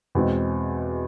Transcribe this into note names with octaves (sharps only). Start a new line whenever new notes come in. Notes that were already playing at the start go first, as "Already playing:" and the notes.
E2 B2 G#3 C4